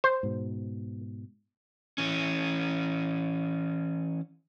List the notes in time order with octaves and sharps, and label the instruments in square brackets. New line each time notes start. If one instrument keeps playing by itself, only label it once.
[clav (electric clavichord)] C5
[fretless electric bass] G#2 B2
[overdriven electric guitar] E3 C#4